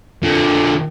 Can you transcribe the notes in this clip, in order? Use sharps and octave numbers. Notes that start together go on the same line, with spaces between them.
A#2 D3